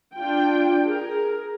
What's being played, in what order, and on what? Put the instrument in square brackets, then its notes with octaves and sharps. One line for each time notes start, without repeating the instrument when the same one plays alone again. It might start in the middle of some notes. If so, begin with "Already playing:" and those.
[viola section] D4 F4 G5
G#4 A#4